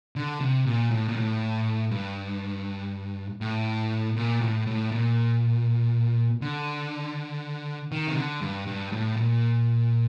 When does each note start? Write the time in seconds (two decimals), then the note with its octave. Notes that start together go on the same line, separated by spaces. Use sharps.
0.16 D3
0.40 C3
0.66 A#2
0.91 A2
1.08 A#2
1.17 A2
1.91 G2
3.41 A2
4.17 A#2
4.41 A2
4.67 A2
4.92 A#2
6.41 D3
7.92 D#3
8.07 C3
8.17 D3
8.41 G2
8.67 G2
8.92 A2
9.17 A#2